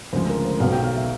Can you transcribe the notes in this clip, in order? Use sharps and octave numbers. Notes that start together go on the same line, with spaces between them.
D2 C#3 F3 G#3 C5
A#4
C5
B1 B2 F#3 F5
G5
F5
E5